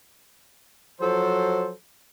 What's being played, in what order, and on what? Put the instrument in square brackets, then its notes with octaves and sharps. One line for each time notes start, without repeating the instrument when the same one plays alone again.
[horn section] F3 F#3 A4 C5